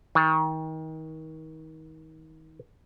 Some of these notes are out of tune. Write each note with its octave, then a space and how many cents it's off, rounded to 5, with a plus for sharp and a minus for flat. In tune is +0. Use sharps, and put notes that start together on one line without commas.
D#3 +30